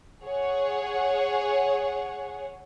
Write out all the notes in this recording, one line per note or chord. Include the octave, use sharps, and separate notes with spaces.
G#4 C#5 F#5